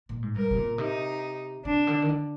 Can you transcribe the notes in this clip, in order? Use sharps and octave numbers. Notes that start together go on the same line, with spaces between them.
A#2
G#2
G2 A#4
C3
A#2
C3 D#4
C3 D4
D3
D#3
D3